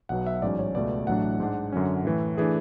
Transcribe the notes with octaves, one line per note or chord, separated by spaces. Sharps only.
B1 B2 F#3 B3 F#5
E5
A1 G#2 F#3 C#4 D5
C#5
C#2 B2 A3 D5
A1 A2 F#3 A3 D4 F#5
G#2 G#3 D4
F#2 D3 F#3 C#4
A2 E3 A3
E3 A3 D4 G#4